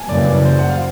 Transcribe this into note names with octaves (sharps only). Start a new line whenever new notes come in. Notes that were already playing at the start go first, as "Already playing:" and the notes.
Already playing: G#5 A5
F#2 C#3 E3 G3 A#3 D5
C5
F#5
F5